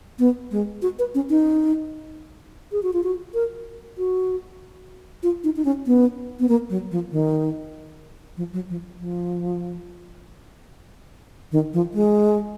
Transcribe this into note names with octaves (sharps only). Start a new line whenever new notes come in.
B3
G#3
F#4
B4
C#4
D#4
G#4
F#4
F4
F#4
A#4
F#4
F4
D#4
D#4
C#4
B3
B3
A#3
F#3
F3
D#3
F3
F#3
F3
F3
D#3
F3
G#3